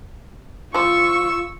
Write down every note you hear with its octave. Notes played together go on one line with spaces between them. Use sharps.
F3 F4 C5 C#6 E6